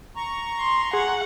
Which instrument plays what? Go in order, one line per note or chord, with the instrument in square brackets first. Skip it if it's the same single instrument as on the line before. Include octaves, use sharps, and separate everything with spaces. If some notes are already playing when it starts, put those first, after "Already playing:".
[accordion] A#5 C#6
[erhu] C6
[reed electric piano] G#4 [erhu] F#5